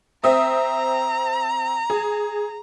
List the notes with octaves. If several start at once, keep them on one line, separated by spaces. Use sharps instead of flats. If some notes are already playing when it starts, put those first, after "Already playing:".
C4 E5 A#5 D#6
G#4